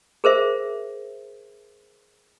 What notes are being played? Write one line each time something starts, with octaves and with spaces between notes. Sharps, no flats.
G#4 A#4 C5 E5